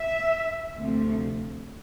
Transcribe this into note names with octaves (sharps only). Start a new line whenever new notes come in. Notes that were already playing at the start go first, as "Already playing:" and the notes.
Already playing: E5
D2 C3 F3 A3